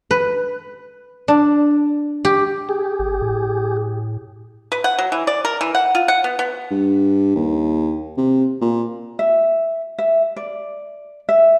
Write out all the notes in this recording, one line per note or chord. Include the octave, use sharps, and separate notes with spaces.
B4
D4
G4
G4 G#4
G#1
A2
B4
F#5
F#3
E3
D5
A#4
E3
F#5
F4
F#5
B3
B3
G2
D#2
C3
A#2
E5
E5
D5
E5